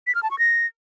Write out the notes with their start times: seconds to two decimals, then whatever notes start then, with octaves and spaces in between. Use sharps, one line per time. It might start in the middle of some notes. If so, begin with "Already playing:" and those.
0.07 B6
0.15 F6
0.23 A5
0.31 C#6
0.39 A#6